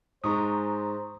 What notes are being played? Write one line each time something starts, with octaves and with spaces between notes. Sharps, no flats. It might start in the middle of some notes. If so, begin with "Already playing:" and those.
G#2 G#3 C5 A#5 C#6 D#6